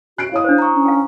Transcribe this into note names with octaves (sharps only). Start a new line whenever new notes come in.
F#4 F#6 C7 D7
E4 C#5 F5 D#6
D4 C5
A#5 C#6
C#4
F5 G5